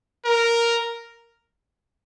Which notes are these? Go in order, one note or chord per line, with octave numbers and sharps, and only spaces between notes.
A#4